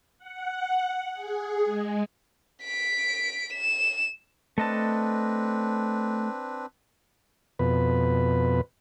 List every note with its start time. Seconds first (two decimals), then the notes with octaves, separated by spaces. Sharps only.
0.18 F#5
1.13 G#4
1.65 G#3
2.63 B6 D7
3.53 E7
4.58 A3 C4 D4 B4 D#5 A5
7.59 F2 B2 B4